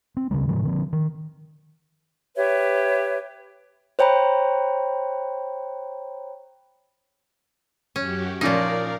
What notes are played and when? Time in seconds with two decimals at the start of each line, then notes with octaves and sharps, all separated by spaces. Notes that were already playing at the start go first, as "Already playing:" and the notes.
0.17 C4
0.31 D2 C#3 F#3 G3
0.47 A2 D3 F3 G#3
0.63 D3 F3 C4
0.93 D#3
2.36 G4 B4 C#5 E5
3.99 C5 C#5 G5 A#5 B5
7.96 F#2 C#4 F#4 G4
8.41 A#2 F3 C#4 D#4 A#4 D5 F5 A#6